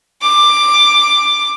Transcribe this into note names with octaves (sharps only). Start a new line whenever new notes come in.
D6